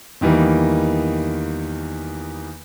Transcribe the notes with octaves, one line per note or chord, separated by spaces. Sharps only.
E2 D#3 E3 G3 A#3